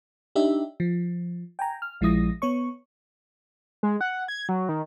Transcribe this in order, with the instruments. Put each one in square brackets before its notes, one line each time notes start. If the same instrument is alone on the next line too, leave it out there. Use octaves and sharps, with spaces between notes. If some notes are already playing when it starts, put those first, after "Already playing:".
[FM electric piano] D4 D#4 G4 E5
F3
G5 G#5 A#5
F6
A#1 F3 G#3 E4 D#6 A#6
B3 C#5 C#6
[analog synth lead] G#3
F#5
G#6
F#3
D#3